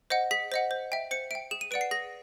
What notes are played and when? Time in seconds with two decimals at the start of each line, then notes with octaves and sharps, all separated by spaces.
0.10 C5 D#5 F#5
0.31 G#4 B6
0.52 C5 D#5 F#5
0.71 C5
0.92 E5 G5
1.11 C5 C#7
1.31 E5 G5 D7
1.51 G#4 E7
1.61 D#7
1.71 B4 D5 F#5 D7
1.81 C7
1.91 G#4 A#6